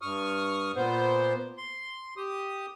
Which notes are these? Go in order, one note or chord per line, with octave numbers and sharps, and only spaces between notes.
G2 C#6 D#6 F6
A#2 B3 C5
C6
G4 D#6